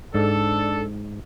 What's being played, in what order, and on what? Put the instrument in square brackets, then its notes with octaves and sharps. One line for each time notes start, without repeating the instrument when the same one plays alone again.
[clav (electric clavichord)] G#2 [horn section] D4 A4